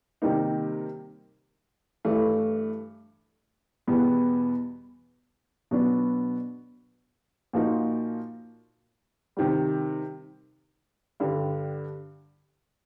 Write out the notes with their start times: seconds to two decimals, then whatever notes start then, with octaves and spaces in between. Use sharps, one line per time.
0.22 C3 D#3 G3 A#3 D#4
2.05 G2 E3 A3
3.87 E2 B2 G3 B3
5.71 B2 F#3 B3 D4
7.53 A#2 F3 A#3 D#4 F#4
9.37 C3 D#3 G3
11.20 G2 D3 G3